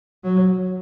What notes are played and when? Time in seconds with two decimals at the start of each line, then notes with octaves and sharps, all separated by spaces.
0.24 F#3